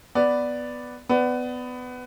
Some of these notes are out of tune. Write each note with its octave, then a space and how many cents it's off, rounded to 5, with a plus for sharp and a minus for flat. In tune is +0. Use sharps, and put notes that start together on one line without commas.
B3 +5 B4 +0 D5 +0
B3 +20 D5 +0